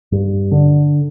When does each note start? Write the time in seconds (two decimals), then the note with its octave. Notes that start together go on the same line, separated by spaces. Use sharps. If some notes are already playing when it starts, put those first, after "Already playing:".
0.12 G2
0.51 D3